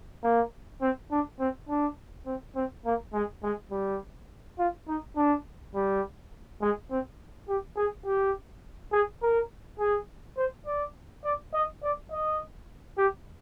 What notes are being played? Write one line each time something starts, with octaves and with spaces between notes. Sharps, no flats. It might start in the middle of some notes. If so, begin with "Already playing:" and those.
A#3
C4
D4
C4
D4
C4
C4
A#3
G#3
G#3
G3
F4
D#4
D4
G3
G#3
C4
G4
G#4
G4
G#4
A#4
G#4
C5
D5
D5
D#5
D5
D#5
G4